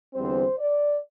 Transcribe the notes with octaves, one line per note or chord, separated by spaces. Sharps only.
E2 D3 G3 C4 C5
D5